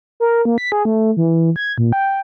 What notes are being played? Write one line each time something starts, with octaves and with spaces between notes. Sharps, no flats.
A#4
A#3
B6
G#4
A3
E3
G#6
A#2
G5